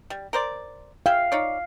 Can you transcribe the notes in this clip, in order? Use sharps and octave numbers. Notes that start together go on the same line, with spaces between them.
G3
A#4 C5 D5
G#4 E5 F5 G5
D#4 C#5 D5